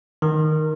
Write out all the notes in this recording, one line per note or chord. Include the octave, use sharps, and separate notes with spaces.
D#3